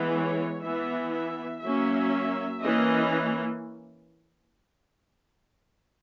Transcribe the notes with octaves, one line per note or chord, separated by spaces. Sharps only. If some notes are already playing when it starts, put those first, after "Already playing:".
Already playing: E3 G#3 B3
C#5
E3 B3 E5
E5
F#3 A#3 C#4 E5
E3 A#3 C#4 D#5